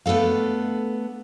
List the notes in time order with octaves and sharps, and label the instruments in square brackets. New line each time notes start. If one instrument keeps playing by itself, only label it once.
[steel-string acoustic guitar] A3 B3 D4 A4 F5